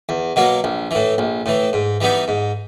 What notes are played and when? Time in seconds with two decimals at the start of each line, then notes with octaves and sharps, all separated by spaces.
0.09 E2
0.36 B2 F#3 A#3
0.64 A#1
0.91 A2 E3
1.18 A#1
1.46 A2 E3
1.73 G#2
2.01 E3 G3 B3 D#4
2.28 G#2